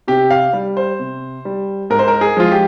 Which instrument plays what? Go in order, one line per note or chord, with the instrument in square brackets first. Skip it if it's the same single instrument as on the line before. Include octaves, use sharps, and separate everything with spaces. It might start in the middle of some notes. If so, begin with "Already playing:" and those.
[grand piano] C3 G4
F5
G3
C5
C3
G3
G#2 A#4
C5
A#4
G#4
F3 G#3 F4
G4